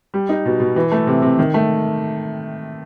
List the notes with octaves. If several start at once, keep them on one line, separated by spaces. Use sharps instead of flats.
G3
D#4
B2
B2
E3
A3
C3
C3
D#3
A3